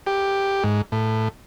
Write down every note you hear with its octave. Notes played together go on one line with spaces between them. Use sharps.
G4
G#2
A2